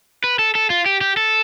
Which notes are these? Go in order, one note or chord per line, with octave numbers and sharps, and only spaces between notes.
B4
A4
A4
F4
G4
G4
A4